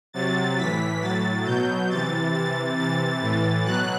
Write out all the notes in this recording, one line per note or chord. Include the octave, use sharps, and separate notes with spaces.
C3 F#3 A6
A2 E3 B6
A2 F#3 A6
B2 F#3 G6
C3 E3 A6
C3 E3 A6
C3 E3 A6
A2 E3
B2 F#3 F#6